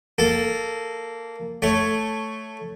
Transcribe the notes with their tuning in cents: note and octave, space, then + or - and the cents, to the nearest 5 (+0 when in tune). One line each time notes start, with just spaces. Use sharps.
A#3 -15 A4 +0
A3 +0 C#5 +0